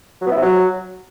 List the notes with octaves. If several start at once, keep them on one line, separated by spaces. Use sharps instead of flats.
F#3
B3
E4
C3
F#3